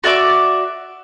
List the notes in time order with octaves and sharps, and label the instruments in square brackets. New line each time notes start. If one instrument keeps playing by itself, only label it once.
[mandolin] F#4 D5 E5 D6